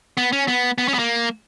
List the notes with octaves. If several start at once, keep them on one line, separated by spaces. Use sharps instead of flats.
B3
C#4
B3
B3
C#4
B3
A#3